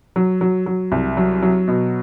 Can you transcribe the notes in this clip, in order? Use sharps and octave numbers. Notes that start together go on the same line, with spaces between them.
F#3
F#3
F#3
C2
F#3
F#3
B2